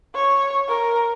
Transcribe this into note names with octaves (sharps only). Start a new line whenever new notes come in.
C#5
A#4